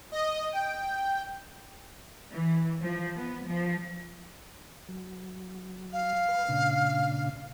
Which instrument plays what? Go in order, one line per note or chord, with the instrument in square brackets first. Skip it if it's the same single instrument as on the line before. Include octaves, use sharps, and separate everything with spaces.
[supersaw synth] D#5
G5
[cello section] E3
F3
B3
F3
[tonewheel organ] F#3
[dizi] F5
[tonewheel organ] B4
A#2 C#3 D4